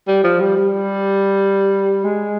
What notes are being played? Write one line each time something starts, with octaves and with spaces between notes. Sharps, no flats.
G3
F3
G3
G3
G#3